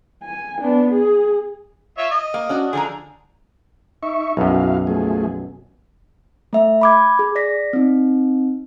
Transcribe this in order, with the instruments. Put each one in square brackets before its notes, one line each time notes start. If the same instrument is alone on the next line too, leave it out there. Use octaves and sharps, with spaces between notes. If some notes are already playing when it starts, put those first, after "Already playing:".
[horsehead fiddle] G#5
B3 D4
G#4
[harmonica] F4 C#5 E5
D#5
[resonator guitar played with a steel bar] A#3
C#4 D4 F#4
[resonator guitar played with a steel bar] D3 F3 A#5 [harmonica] G#4
[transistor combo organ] D#4 E5 C#6
[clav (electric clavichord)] B1 F#2 [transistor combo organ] E4 F#4 F5
[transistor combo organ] F3 A3 G#4
[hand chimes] A3 E5
B5 D6 G#6
G#4
D5 A#6 B6
C4 D#4